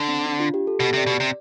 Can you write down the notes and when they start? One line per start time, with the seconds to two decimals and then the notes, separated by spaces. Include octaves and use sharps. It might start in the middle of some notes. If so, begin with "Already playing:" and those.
Already playing: D3
0.08 C4
0.26 D4
0.40 F4
0.54 G4
0.67 A4
0.80 B2 G4
0.93 C3 D5
1.07 B2
1.20 C3